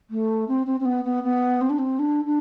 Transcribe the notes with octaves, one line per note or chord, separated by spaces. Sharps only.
A3
C4
C4
C4
B3
B3
B3
C4
D4
C4
D4
D4